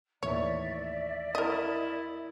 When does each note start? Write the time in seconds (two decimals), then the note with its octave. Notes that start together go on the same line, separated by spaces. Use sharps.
0.23 D#2 A2 E3 C#5 D5 E5
1.35 E4 A#4 D#5